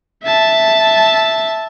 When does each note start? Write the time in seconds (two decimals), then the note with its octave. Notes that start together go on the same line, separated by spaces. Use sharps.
0.24 E5 A5